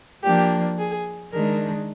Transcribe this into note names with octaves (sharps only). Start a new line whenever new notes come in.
F3 A#3 D4 G4
G#4
D#3 G#3 D4 A#4